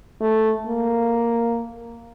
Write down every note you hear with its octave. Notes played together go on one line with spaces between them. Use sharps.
A3
A#3